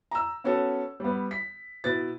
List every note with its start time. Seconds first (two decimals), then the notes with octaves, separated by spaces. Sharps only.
0.11 A#5 E6
0.44 B3 C#4 F#4 A4
1.00 G3 B3
1.31 B6
1.84 B2 E4 B4 A6